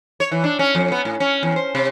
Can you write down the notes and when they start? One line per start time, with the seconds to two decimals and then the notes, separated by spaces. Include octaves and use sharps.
0.20 C#5
0.31 E3
0.44 D4
0.59 C#4
0.75 F2
0.92 B3
1.05 A2
1.20 C#4
1.43 E2
1.56 C5
1.75 C3